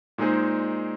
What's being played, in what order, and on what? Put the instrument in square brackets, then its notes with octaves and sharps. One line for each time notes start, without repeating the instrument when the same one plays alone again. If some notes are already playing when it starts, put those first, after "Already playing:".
[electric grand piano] A#2 G#3 D#4 G#4 C5